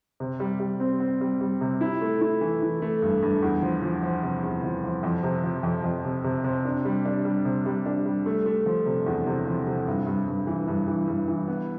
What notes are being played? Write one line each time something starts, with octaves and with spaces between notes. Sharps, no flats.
C3
G3
G3
C4
C4
G3
G3
C3
E4
A3
E4
E3
E3
A3
G2
G2
E2
F3
F3
F3
C3
E2
F3
F3
F2
C3
F3
F2
F2
C3
C3
C3
D4
G3
D4
G3
C3
G3
D4
G3
A3
A3
F3
C3
E2
C3
F3
C3
G2
G2
G2
E3
G2
E3
G2
E3
B3